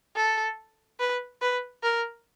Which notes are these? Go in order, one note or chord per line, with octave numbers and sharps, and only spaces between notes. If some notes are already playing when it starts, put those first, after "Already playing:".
A4
B4
B4
A#4